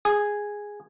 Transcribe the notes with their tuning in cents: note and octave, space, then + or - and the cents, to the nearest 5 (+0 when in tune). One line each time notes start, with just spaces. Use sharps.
G#4 -5